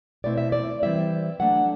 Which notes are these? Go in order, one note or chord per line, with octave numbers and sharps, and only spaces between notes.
B2 A3 C4 E4 D5
E5
D5
E3 G3 C4 E4 E5
F#3 A3 D4 F#5